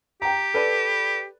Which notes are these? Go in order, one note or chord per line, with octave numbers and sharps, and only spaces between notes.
G4 G5 A#5
A4 B4 D5